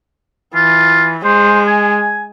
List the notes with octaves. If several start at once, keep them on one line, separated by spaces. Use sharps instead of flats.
E3 F4
G#3 C5
G#5